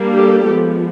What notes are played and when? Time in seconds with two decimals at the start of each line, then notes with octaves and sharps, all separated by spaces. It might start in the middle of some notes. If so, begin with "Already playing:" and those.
Already playing: G3 A#3 D4
0.14 G4 A4
0.45 F3 G#3 B3